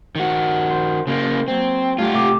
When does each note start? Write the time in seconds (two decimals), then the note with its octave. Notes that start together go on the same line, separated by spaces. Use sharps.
0.16 D#3 F#4
0.70 C5
1.07 C#3 A#3 C5
1.48 F#3 A#3 C4 C5
1.98 G2 A3 D4 F4 G4
2.13 A2 C3 D6